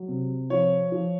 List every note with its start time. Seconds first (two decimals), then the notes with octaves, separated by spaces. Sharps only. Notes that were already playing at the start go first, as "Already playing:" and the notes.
Already playing: F#3
0.08 C3
0.50 F3 C#5
0.92 F3